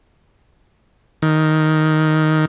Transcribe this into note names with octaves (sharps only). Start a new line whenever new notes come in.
D#3